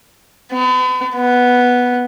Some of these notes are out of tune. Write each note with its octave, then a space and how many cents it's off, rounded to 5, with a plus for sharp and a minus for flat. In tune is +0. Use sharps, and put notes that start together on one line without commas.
B3 +40
B3 -5